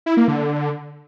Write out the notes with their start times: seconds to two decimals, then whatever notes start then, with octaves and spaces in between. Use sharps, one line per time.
0.06 E4
0.17 A#3
0.28 D3